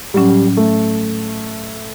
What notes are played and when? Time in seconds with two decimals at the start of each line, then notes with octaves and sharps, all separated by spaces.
0.14 A2 F#3 G3 C#4
0.57 A3